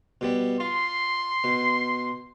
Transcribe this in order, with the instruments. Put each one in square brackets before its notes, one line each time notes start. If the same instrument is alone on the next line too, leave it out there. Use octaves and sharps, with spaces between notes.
[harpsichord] B2 G3 B3
[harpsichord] F4 [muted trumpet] C6
[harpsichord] B2